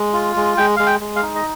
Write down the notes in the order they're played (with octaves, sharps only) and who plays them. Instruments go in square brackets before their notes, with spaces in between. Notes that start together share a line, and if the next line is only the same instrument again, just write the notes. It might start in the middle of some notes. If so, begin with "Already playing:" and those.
Already playing: [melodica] G#3
F4
G#3
G#3 G5
G#3 F5
G5
G#3
F5
D#4
D#5